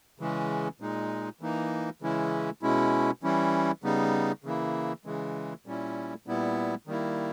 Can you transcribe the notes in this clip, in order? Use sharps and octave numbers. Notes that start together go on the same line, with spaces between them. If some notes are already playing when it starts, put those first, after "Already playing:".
C#3 E3 G#3 C#4
A#2 G#3 D#4
E3 A#3 D#4
C#3 E3 G#3 C#4 E4
B2 G#3 C#4 E4
E3 G3 C#4 E4
C#3 G3 B3 D#4
C#3 E3 A#3 E4
C#3 E3 G#3
A#2 G3 C#4 E4
A#2 G3 B3 E4
D#3 G3 A#3 E4